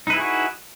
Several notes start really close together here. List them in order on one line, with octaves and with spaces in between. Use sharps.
D#4 B4 E4 G#4 F#4